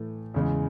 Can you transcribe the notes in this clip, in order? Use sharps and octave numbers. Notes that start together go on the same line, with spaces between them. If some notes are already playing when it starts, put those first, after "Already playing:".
Already playing: A2 E3 A3
E2 C#3 G#3